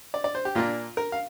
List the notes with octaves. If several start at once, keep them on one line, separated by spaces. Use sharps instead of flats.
D5
D5
C5
G4
A#2 A#3 D4 F4
A#4
F5